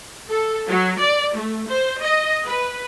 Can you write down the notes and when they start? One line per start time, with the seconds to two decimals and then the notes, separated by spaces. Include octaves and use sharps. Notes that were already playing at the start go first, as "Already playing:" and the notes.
0.30 A4
0.68 F#3
0.99 D5
1.36 A3
1.69 C5
2.01 D#5
2.46 B4